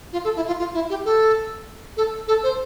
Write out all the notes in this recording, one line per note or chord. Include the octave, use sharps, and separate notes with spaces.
F4
A4
E4
F4
F4
E4
G4
A4
A4
A4
C5